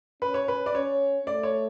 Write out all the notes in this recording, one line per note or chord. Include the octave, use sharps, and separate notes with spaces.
C#4 B4
C#5
B4
D5
C#4 C#5
A3 D5
C#5